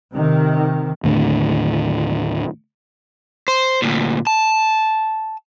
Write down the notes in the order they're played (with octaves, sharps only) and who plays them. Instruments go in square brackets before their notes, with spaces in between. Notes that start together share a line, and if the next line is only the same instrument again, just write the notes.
[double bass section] C3 D#3
[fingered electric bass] D#2 A2 D3
[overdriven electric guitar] C5
D2 A#2
A5